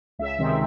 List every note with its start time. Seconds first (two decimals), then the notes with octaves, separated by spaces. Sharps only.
0.19 C#2 E5
0.39 C3 D#3 G#3 C4